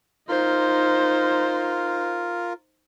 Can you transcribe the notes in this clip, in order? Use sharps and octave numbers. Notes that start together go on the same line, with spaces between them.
D#4 F4 A#4 C5